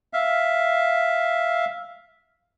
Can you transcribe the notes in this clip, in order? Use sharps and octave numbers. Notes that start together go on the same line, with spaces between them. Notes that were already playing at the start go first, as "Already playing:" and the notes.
E5 F5